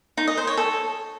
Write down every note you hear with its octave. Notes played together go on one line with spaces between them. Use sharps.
D#4
D#5
C5
C#5
A4